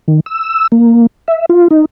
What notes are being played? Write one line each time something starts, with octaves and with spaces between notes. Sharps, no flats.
D#3
E6
A#3
E5
F4
D#4